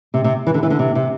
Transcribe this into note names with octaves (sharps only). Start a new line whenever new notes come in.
C3
C3
E3
D3
E3
D3
C3
C3